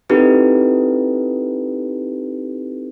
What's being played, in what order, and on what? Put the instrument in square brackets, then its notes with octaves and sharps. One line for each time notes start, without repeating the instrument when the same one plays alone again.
[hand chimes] C4 D#4 E4 G4 A4 B4